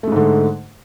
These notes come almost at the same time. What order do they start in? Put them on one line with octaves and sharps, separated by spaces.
A3 G#3 G#2 D3